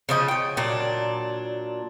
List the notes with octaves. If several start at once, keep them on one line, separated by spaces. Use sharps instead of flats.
C#3 F3 D#5 G5
C#5 G5
A#2 F#3 D4